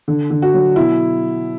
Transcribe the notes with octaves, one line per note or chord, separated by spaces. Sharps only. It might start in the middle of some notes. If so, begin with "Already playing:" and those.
D3
D3
F#4
F#3
B2 E4